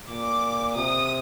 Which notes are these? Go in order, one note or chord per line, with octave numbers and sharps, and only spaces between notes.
A#2 D6
C3 D#6